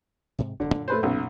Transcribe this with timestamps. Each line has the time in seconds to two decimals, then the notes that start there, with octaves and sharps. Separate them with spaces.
0.39 G#2 C3
0.60 E1 D2 D3
0.74 F#2 A#2 A#3
0.88 A3 B4 C5
1.03 B1 C#3